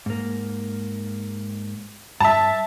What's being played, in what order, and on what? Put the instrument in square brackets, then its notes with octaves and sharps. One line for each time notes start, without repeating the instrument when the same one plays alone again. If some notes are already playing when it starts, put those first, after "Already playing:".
[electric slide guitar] G#2 A#3
[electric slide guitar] G2 [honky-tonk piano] E5 A5